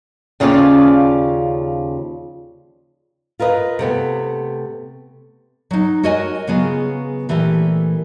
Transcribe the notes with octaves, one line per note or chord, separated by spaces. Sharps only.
D#2 C#3 F3 C#4 F4 D5
F4 A#4 B4 D#5
C3 A3 B3
F#3 D#4
F#4 A#4 C#5 D#5 F#5 G#5
C#3 F#3 B3 F4 G#4
A#2 E3 A3 G4 A#4